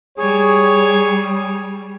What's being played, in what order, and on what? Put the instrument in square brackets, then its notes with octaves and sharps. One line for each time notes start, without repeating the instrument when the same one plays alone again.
[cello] G3 [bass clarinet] G#4 [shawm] C#5